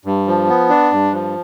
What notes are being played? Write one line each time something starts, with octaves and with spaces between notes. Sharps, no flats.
G2
F3
B3
D4
G2
F3